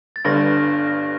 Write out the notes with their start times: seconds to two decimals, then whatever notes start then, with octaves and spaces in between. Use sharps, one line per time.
0.16 A6
0.25 G1 G2 D3 A#6
0.88 A#6